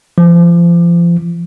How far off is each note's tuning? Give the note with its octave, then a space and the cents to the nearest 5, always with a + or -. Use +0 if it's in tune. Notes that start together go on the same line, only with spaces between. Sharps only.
F3 -30